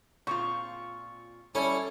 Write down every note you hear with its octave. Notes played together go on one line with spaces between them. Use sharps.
A#2 C4 F4 C#6
G3 C#4 E4 A4 C#6